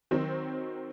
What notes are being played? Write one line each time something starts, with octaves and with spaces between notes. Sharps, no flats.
D#3 F#3 C4